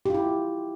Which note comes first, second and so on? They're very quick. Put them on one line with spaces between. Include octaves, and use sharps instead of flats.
G4 F4 E4